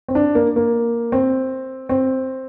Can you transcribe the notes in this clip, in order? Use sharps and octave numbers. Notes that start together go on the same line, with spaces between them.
C4
D4
A#3
A#3
C4
C4